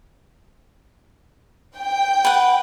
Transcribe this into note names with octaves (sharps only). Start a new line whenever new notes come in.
G5
B4 F#5